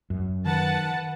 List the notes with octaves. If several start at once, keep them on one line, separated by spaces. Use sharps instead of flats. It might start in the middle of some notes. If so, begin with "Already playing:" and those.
F#2
D#3 B4 F#5 A5